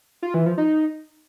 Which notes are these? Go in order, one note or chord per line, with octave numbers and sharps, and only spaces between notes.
F4
E3
F3
D#4